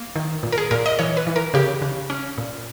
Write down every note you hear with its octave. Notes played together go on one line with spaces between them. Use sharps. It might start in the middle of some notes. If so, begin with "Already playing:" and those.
Already playing: A#3
D#3
A#2
A#4
G#4
A#2 A#4
D#5
E3 C#5
B4
E3
A#4
C#3 G4
C#3
C#4
A#2